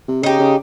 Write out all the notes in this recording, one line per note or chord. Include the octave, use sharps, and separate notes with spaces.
C3
C#3 D#4 G4
C#3